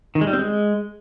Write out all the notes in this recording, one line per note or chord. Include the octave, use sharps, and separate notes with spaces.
D#3
G#3
G3
C4
G#3